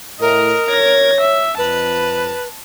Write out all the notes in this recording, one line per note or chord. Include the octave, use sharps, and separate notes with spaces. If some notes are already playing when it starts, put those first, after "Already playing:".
A2 A#4 D#5
C#5 G#6 A#6
E5
F2 B4 A5